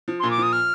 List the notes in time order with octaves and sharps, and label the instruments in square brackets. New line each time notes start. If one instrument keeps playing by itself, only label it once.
[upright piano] F3
[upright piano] A#2 [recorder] C6
[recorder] D6
[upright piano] F3 [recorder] D#6
[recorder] F6